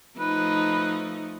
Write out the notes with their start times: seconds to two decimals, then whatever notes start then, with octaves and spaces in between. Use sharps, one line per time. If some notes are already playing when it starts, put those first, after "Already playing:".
0.19 F3 A3 D#4 B4